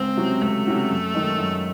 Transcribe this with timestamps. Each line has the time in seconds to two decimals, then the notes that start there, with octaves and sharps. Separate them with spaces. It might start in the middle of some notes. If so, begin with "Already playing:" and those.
Already playing: C#2 C4
0.17 C3 F#3 C#4 F#4
0.41 C#2 A3
0.67 C3 F#3 C#4 F#4
0.90 F#2
1.14 D#3 G#3 D#4 A4
1.39 F#2